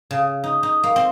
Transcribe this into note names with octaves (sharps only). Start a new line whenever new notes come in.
C#3
D#4
D#4
A#3
C4